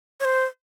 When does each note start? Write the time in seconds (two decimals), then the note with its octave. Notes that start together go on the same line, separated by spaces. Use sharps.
0.20 C#5
0.25 C5